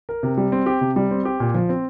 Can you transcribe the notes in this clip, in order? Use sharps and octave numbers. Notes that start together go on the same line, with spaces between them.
A#4
C3
G3
C4
G4
C3
G3
C4
G4
A#2
F3
C4